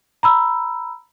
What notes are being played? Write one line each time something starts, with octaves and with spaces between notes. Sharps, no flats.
A#5 B5 E6